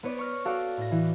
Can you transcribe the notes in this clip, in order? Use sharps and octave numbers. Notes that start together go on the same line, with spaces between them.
B3 B4 C#5 D5
C#6 F6 A#6
F#4 A4 D5 F5 F#5
A2 A#6
E3